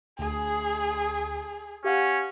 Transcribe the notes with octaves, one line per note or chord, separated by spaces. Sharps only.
D2 G#4
C#4 G4 F5 F#5